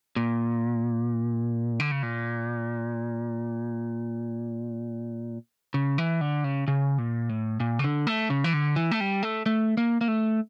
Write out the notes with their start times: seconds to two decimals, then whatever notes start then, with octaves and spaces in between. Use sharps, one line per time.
0.16 A#2
1.80 D3
1.91 C#3
2.03 A#2
5.74 C#3
5.98 E3
6.21 D3
6.44 C#3
6.68 C#3
6.98 A#2
7.29 A2
7.60 A#2
7.79 C#3
7.84 D3
8.07 A3
8.30 C#3
8.44 E3
8.54 D3
8.76 E3
8.91 A3
9.00 G3
9.23 A3
9.46 A3
9.77 A#3
10.01 A#3
10.08 A3